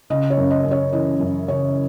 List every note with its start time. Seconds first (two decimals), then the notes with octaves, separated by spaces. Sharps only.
0.10 C#3 D#5
0.30 C#5
0.37 F#2
0.51 D#5
0.65 F#2
0.71 C#5
0.93 E3 D#5
1.20 F#2
1.48 C#3 C#5